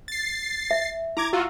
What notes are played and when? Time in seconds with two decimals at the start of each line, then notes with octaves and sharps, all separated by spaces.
0.08 A6 C7
0.71 E5
1.17 E4 A#5 D6 G#6
1.33 F4 F#4 E6